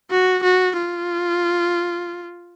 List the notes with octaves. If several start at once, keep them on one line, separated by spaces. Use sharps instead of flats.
F#4
F#4
F4